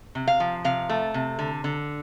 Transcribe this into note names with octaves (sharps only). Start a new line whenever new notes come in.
C3
F5
F3
C3 F5
A3
C3
D3
D3